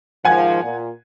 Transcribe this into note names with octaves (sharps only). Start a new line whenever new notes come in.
G#2 D#3 F3 F#5 G#5 G#6
A#2